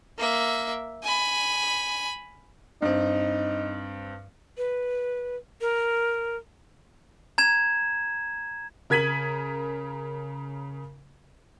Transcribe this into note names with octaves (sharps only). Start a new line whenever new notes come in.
A#3 E5
G#5 B5
G2 C4 D#4
B4
A#4
A#5 G#6 E7
C#3 A#4 G#6 B6 D#7 F#7